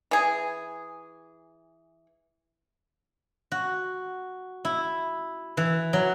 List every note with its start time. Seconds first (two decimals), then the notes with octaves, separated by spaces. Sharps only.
0.11 E3 G#4
3.52 F#4
4.65 E4
5.57 E3
5.93 F#3